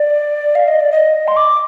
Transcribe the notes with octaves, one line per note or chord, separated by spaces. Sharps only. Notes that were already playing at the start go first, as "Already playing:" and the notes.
Already playing: D5
F5
D#5
D5
D#5
C6
D6